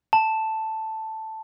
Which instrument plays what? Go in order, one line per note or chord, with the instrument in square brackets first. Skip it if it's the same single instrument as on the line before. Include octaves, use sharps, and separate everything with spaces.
[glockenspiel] A5